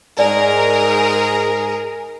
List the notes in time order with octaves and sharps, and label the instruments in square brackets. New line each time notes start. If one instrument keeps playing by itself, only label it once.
[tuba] G#2 [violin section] G#4 A#4 [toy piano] D5 G#5